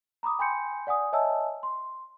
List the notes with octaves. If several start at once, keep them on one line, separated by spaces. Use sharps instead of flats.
A#5 B5 D6 D#6
G5 G#5 B5 C6 G6 C#7
D5 F#5 G#5 D#6
C#5 D#5 E5 G#5 A5 E6
C6